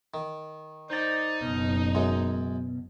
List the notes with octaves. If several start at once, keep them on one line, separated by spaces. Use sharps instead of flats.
D#3
D#4 C5 D5
F#1 B2
F#2 G#3